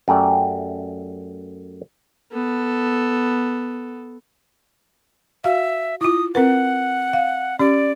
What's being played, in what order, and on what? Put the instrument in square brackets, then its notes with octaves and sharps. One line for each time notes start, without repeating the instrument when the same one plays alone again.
[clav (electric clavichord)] F#2 A3 G4 D5
[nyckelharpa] B3 A4
[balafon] F#4 F5 [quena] E5
[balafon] E4 F4 [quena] D#6
[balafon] C4 A#4 B4 [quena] F#5
[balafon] F5
[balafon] C#4 G4 [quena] D5